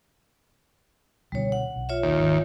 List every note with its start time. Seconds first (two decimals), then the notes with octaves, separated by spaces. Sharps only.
1.32 C#2 B2 D3 G3 C#5
1.52 F#5
1.76 B1
1.89 F4 C#5 E5
2.04 D#2
2.18 G#1 D#3